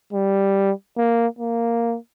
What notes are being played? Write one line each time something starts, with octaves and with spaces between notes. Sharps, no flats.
G3
A#3
A#3